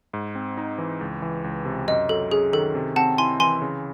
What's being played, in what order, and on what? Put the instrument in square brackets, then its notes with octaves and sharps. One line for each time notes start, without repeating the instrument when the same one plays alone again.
[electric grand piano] G#2
C4
D#4
E3
C#2
E3
C#2
C3
[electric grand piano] F#2 [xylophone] D#5
[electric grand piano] F#3 [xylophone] A4
[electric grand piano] C#4 [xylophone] G#4
[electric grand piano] D#3 [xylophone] A4
[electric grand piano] C3
[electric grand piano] C4 [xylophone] F#5 A5
[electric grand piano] E4 [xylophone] G#5 C6
[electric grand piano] E3 [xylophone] G#5 C6
[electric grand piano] C#3